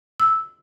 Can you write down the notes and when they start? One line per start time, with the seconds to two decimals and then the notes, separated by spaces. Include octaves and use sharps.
0.20 E6